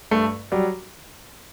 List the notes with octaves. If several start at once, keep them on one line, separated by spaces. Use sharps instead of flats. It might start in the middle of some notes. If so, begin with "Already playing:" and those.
G2 A3
F#3 G3